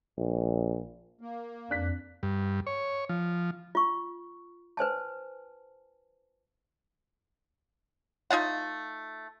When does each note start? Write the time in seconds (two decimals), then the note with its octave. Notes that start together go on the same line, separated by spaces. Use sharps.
0.17 A#1
1.21 A#3
1.70 F2 D4 F#6 B6
2.23 G2
2.67 C#5
3.09 F3
3.75 F4 C#6
4.77 B4 C5 G#5 A5
8.30 A3 D#4 F4 F#5